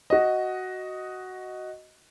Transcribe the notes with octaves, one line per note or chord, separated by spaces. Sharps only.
F#4 D#5